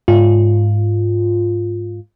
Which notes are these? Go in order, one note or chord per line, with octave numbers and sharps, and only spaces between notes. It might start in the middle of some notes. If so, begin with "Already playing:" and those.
G#2 F4